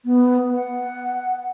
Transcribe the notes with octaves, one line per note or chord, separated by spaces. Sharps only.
B3
F#5